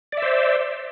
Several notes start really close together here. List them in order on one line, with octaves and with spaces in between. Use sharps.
D5 E5 C5